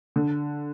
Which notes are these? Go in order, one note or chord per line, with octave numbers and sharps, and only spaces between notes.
D3